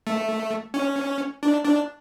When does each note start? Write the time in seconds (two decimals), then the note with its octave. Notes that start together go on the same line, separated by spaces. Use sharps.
0.07 A3
0.74 C#4
1.43 D4
1.65 D4